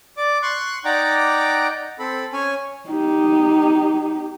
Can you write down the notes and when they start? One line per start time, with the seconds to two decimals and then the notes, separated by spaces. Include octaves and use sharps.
0.17 D5 D6
0.43 C6 C#6 F#6
0.85 D#4 D5 F#5 G5 A#5 D6
1.99 C4 A4 B5
2.33 C#4 C#5 G#5
2.88 D#4 G4